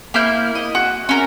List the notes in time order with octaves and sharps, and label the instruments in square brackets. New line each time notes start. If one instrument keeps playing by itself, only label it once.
[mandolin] A#3 E4 F6 G6
D#5
F#4
C#4 A#4